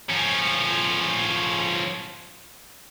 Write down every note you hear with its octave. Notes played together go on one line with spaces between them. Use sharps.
F3 C#4